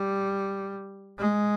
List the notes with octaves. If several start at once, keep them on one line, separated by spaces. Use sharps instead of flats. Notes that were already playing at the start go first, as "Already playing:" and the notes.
Already playing: G3
G#3